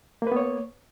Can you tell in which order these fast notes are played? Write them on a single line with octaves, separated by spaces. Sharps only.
A#3 B4 B3 C#5